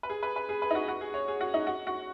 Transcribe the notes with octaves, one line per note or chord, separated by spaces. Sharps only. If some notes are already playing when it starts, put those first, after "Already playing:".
B4
G#4
B4
B4
G#4
B4
D#4
F#4
F#4
G#4
C#5
G#4
F#4
D#4
F#4
F#4